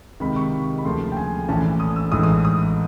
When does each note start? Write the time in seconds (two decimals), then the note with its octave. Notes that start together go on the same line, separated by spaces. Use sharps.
0.20 C#2 C3 D#3 B5
0.36 C#6
0.78 B5
0.84 D2 C#3 F3 A#3 C6
1.12 G5
1.17 G#5
1.49 A#1 A2 E3 A3 C#4 A5
1.80 D#6
1.96 E6
2.12 A1 G#2 E3 A3 D#6
2.23 D#6
2.45 D#6